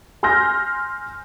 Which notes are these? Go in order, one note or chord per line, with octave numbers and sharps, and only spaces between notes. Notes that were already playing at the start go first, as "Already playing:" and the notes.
G#5 C6 E6 F6 G6 A#6